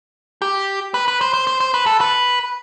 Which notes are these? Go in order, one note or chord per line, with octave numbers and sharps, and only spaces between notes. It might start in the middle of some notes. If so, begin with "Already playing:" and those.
G4
B4
B4
C5
C5
C5
C5
B4
A4
B4